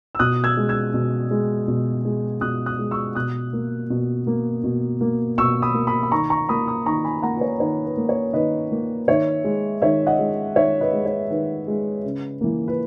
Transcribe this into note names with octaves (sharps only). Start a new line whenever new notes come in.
E6
B2 D#6 F#6
E6 G#6
G#3
E6 G#6
B2
G#3
B2
G#3
B2 D#6 F#6
D#6 F#6
G#3
C#6 E6
B2 D#6 F#6
A#3
B2
A#3
B2
A#3
B2 C#6 E6
B5 D#6
A#3
B5 D#6
B5
D#3 A#5 C#6
A#5 C#6
A#3 B5 D#6
B5 D#6
D#3 A#5 C#6
G#5 B5
A#3 F#5 A#5
B4
C#5
D#3 C#5
B4
A#3
C#5
D#3 B4 D#5
A#3
D#3 C#5 E5
G#3
D#3 C#5 E5
D#5 F#5
G#3
D#3 C#5 E5
B4 D#5
G#3
C#5
D#3 B4
G#3
C#3
E3 A#3
B4